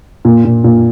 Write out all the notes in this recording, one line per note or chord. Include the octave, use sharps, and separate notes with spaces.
A#2
A#2
A#2